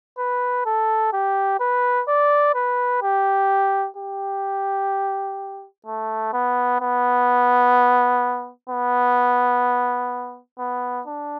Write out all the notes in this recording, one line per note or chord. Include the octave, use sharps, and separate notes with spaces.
B4
A4
G4
B4
D5
B4
G4
G4
A3
B3
B3
B3
B3
D4